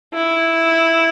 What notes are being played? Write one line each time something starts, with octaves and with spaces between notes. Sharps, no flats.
E4